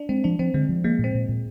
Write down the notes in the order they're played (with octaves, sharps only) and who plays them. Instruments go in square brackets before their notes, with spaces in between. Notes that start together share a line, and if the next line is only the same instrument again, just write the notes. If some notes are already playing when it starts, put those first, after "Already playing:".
Already playing: [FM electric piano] D4
[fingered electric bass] G#3 [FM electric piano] C4
[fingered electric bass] F3 [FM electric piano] D4
[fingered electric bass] F3 [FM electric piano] C4
[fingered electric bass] D3 [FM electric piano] G#3
[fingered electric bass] F3
[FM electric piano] G#3 [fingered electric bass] A#3
[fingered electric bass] A#2
[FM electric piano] C4
[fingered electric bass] A#2
A#2